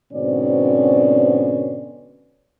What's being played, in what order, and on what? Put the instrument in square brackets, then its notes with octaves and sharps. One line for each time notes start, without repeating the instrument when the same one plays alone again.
[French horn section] G#2 B2 D3 C4 C#4 D5